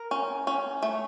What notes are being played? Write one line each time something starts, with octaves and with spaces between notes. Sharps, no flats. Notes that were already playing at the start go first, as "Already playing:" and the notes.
Already playing: A#4
C#4
C#4
A3